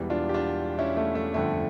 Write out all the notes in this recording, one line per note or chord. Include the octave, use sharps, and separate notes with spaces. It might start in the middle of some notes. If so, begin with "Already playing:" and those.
Already playing: E1 E2 E3 G3
D4 F4
G4
D4 F4
C#4 E4
A3 C#4
A3
G1 F2 D3 A3